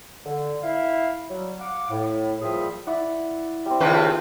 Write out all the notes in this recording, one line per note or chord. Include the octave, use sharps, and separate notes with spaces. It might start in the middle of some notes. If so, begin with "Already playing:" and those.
D3
E4 F5
F#3 G3
F5 F#5 D6
A2
A#2 F3 G3 G#4 E5 G5
E4 D5 F#5
G3 C4
D#2 C#3 F4 B4 D5